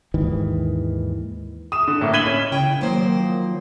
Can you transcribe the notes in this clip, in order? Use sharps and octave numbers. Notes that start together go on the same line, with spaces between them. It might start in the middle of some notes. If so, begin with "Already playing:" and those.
D#2 G#2 D#3 E3
D#6 E7
D3
A2 A#3
G#6 B6 D#7 E7 F#7 G7
C#4
C#3 E4 G5
D#3 F3 F#3 A#3 C5